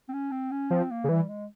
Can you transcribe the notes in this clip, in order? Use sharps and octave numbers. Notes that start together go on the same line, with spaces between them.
C4
C#4
C4
C#4
F3 C4
A#3
C#3
E3 G3
G#3